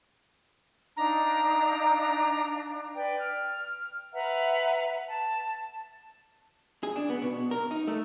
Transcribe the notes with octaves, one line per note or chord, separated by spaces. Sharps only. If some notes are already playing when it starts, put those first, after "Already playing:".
D4 D#4 F5 A#5
B4 D5 G5
F6
B4 E5 F#5 A#5
A5
G#4
D4
B3
B2
A#4
D#4
A3